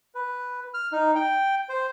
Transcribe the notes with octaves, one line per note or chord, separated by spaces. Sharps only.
B4
F6
D#4
G5
C5